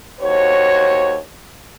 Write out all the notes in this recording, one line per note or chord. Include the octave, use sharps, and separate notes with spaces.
D#2 F#4 C5 C#5